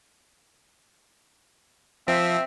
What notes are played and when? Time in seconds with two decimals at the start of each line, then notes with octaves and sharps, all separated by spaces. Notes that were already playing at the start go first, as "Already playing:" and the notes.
2.08 F3 C4 E5